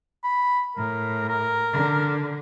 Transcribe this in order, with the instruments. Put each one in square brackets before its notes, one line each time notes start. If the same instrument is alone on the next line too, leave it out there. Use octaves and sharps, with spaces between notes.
[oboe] B5
[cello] A2 [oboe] A#4
[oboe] A#4
[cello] D3